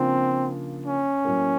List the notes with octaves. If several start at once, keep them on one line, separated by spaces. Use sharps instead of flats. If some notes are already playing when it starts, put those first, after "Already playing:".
Already playing: C#3 F3 A#3 C4 D4 F4
C#4
A2 F#3 A#3